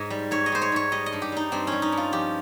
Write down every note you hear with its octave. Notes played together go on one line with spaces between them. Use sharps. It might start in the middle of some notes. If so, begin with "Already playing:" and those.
Already playing: G#2 C#5 D#5
G3
G#2 C#5
D#5
G3 C5
C#5
G#2 C#5
G3 D#5
D#5
G2
G4
G3 D#4
G2 C4
G3 C#4
D#4
G2
F4
F3 G4